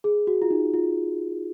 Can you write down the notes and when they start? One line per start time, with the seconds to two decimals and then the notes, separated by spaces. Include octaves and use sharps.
0.04 G#4
0.27 F#4
0.42 F4
0.51 D#4
0.74 F4